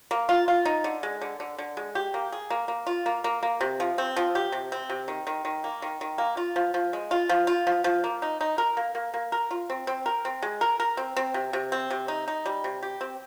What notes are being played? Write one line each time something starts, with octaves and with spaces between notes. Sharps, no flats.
A#3
F4
F4
D#4
D3
G#3
D3
D3
D3
G#3
G4
A#3
G#4
A#3
A#3
F4
A#3
A#3
A#3
C3
F3
C4
F3
G4
C3
C4
C3
D#3
D#3
D#3
A#3
D#3
D#3
A#3
F4
F3
F3
G#3
F4
F3
F4
F3
F3
A#3
D#4
D#4
A#4
A#3
A#3
A#3
A#4
F4
C4
C4
A#4
C4
G#3
A#4
A#4
C4
C4
C3
C3
C4
C3
D#4
D#4
G3
C3
G4
C4